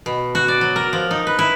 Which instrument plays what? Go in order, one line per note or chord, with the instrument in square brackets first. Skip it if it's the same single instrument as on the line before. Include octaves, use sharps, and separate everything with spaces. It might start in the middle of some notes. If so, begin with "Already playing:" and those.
[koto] B2
F#4
D5
F#3
A#4
F3
D#4
B4
E4